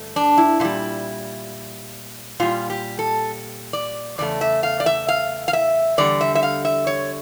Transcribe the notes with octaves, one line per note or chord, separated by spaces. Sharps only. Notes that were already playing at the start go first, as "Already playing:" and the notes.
Already playing: G2 D3 A3
D4
E4
A#2 G3 E4
A#2 G3 F4
G4
A4
D5
E2 C#3 A3 D5
E5
F5
D5
E5
F5
F5
E5
E2 D3 G3 D5
E5
E5
F5
E5
C#5